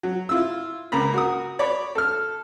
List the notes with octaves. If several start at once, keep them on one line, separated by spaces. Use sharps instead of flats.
F#3
E4 F4 E6
C#2 C#3 A#3 A#5 B5
F#4 A#4 D#6
C#5 D5 B5
A4 F6